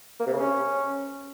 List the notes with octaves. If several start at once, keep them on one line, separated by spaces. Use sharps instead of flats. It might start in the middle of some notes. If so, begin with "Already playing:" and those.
A#3
C3
C#3
C#4